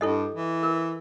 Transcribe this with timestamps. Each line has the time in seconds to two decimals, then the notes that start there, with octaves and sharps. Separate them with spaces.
0.01 G2 E4 A4 D#5
0.35 E3
0.63 A#4